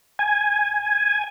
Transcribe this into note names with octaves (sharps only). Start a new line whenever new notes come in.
G#5